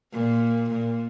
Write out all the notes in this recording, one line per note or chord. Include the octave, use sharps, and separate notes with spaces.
A#2
A#2